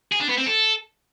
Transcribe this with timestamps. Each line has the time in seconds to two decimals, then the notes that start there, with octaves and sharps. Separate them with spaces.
0.12 G#4
0.20 D4
0.29 B3
0.38 C4
0.46 A4